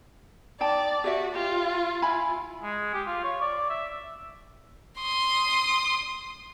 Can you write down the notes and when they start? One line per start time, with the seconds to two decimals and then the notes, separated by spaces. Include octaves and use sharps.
0.60 D#4 D5 G5 A5
1.04 F#4 G4 D5 E5
1.35 F4 G4
2.02 E4 G#5 B5
2.63 G#3
2.94 G4
3.07 F4
3.24 C#5
3.41 D5
3.70 E5
5.01 C6 D#6